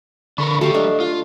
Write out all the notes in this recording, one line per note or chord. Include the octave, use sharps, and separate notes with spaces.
D3 D4 A4 A#4 B5 C#6
D3 F#3 A3 F#4 G4 F5 B5
D4 A4 D#5
F4